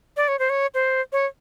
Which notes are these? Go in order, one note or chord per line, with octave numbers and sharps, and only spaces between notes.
D5
C#5
C5
C#5
C5
C#5